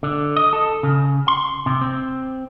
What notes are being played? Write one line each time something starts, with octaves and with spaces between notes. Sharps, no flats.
D3
D#5
A4
C#3
C6
C3
C4